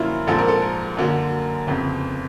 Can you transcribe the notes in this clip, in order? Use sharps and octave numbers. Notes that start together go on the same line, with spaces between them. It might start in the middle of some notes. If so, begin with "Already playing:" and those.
Already playing: F#2 D3 F3 A#3 C#4 E4 F4
A#1 G#2 F3 A4
A#4
A4
A#4
F#2 D3 F#3 A#3
G1 F2 C#3